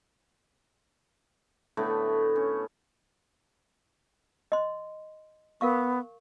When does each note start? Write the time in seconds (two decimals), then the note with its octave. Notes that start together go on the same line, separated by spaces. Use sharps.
1.77 A2 D3 A3 B3
2.36 C#4
4.52 D#5 C6
5.61 B3 A#4 F5 C#6